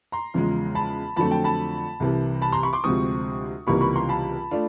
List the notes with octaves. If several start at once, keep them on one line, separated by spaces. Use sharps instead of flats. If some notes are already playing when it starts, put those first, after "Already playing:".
A#5 C6
E2 C#3 F3 G#3
A5 B5
F2 D3 F#3 A3 C4 A5 B5
G5 A5
A5 B5
C2 C3 E3
A5 B5
A#5 C6
B5 C#6
C6 D6
D2 C3 F3 G#3 C4 C#6 D#6
C#2 C3 E3 G3 A#3 B5 C#6
B5 C#6
A#5 C6
A5 B5
A3 D4 F4